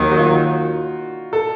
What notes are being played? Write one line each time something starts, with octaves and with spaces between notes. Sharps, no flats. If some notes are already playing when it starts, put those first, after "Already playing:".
Already playing: D#2 D#3 F#3 D#4
F#4
F4
A4